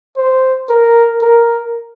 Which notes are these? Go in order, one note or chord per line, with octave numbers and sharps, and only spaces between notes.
C5
A#4
A#4